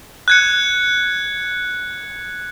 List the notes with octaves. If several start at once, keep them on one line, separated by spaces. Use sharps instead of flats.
F#6 G#6 C#7